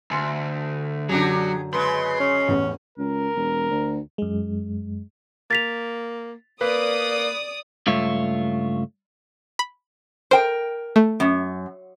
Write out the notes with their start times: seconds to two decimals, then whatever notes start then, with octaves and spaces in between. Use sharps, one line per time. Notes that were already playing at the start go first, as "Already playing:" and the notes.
0.11 D2 G#5 C6
1.09 F#2 D3 F#3 D4 G4 G#4
1.74 C#3 G#3 B4 C6
2.20 C#4
2.48 A1 E2
2.98 C#2 A#4
3.36 E1
3.70 D2
4.18 F#2 G#3
5.51 A#3 A6 B6 F7
6.61 A#3 B4 D5 D#6
7.87 C#2 G2 A3 F4 C#5 E5
9.59 B5
10.31 A#4 C5 G5
10.96 A3
11.20 F#2